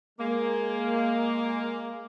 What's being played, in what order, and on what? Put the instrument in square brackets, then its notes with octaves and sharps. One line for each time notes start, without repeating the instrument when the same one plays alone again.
[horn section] G#3 A#3